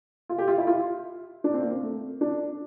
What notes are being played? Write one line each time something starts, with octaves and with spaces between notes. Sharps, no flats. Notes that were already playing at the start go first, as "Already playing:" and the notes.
F4
G4
F4
E4
F4
D4
C4
A#3
C4
A3
D4